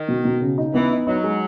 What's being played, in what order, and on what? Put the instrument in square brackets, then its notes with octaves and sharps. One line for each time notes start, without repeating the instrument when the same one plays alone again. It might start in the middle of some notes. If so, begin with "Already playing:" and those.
Already playing: [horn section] D#3
[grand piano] B2
B2
C#3
D#4
[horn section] E3 [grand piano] B3
[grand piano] D#4
[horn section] F#3 [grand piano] D#4
[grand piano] G#3